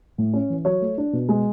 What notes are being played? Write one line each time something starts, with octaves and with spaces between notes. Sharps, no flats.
A2
C#4
E3
F#3 C#5
A3
D4
B2
G#3